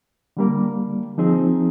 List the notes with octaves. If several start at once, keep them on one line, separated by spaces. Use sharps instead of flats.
D3 G3 A#3
F3 C4 D#4 G#4